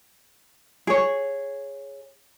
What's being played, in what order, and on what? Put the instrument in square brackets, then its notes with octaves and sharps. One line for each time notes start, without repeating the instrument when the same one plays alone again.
[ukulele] G#4 C#5